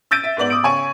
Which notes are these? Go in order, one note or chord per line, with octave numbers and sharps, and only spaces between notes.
E6 G6 A6 D7 D#7
E5
G#2 B3 D5 F#7
D6 D#6 D7
C#3 C#5 G#5 C#6 D#7